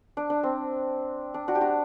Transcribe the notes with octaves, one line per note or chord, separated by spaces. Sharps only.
D4
D4
C4
D4
D4 F#4
G4
D4 F#4